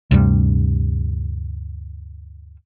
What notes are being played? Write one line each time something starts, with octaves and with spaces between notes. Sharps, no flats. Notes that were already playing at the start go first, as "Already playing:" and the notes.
D2 G2 C3 G3